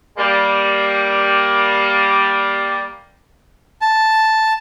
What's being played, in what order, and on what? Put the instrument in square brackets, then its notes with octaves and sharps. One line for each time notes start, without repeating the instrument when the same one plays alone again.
[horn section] G3 A#3
[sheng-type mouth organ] A5